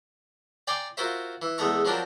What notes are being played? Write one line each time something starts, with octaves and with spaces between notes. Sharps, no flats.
D5 G5 G#5 A#5 C6 D6
F4 F#4 A#4 C5 E5
E3
E2 G#3 A3 A#5 C#6
F3 F#3 C4 D4 A#4